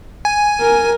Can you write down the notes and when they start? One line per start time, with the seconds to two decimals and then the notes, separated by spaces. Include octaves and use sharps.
0.25 G#5
0.60 A#4